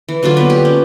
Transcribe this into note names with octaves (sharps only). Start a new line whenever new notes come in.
E3
D3 F#3 D4 F4
A#3 B3 B4
G4
C#4